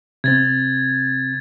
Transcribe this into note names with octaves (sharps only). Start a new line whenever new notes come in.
C3 C4 G#6 A6